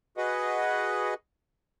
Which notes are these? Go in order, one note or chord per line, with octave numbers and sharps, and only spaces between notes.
F#4 G#4 B4 D#5 F#5